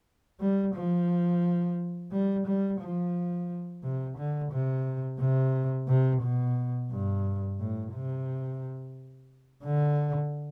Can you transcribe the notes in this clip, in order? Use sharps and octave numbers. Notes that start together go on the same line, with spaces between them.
G3
F3
G3
G3
F3
C3
D3
C3
C3
C3
B2
G2
A2
C3
D3